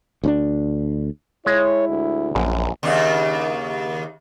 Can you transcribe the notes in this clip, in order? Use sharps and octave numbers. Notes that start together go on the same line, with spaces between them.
D2 C#4 D4
G#3 E4 C#5
D2
A#1 F#2
D#2 C#3 D4